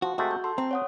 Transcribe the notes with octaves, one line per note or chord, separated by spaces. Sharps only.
F3 F#4
C3 G#3 A3 F#4
G6
A4 C6
C4 G5 A5 A#5
C#5 F#5 D#6